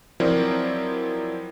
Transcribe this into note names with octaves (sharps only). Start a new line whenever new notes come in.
F3 F#3 C4 E4 A#4 D5